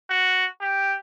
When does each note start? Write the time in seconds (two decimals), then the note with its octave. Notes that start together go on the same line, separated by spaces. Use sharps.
0.10 F#4
0.61 G4